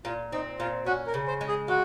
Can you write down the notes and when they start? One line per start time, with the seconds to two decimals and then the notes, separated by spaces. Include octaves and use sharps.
0.05 A#2 F4
0.32 C4 D#4
0.60 A#2 F4
0.86 C#4 F#4
1.07 A#4
1.14 C#3
1.28 C5
1.41 G#3
1.48 G#4
1.68 F4 F#4